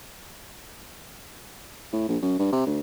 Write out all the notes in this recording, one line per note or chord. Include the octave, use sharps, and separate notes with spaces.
A2
A#1
F#2
G2
C3
D2